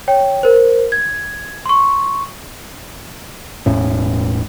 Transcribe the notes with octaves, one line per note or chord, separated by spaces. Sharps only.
C#5 G5
A#4 C5
G#6
C6 C#6
E1 E2 A2 C#4